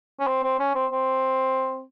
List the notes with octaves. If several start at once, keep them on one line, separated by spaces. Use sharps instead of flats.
C#4
C4
C4
C#4
C4
C4